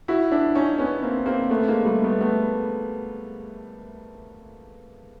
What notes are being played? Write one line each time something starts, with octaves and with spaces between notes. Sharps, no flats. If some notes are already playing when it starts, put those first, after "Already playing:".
E4 F#4
D4 E4
C#4 D#4
B3 C#4
A#3 C4
A#3 C4
A3 B3
G#3 A#3
G3 A3
A3 B3
A3 B3